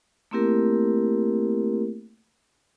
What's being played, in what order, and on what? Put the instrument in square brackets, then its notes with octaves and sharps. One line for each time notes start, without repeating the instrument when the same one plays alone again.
[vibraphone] A3 A#3 C4 E4 G4 A#4